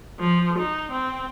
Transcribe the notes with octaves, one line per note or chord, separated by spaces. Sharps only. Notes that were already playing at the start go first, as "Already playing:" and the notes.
F3
D#4
C4